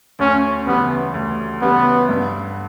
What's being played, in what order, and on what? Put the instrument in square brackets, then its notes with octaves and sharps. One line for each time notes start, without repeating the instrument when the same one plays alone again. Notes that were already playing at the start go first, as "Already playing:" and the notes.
[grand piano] D2 [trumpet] C#4
[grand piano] C#3 E3 G3 [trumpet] B3
[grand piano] D2
[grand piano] C#3 E3 G3 [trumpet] B3
[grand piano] G2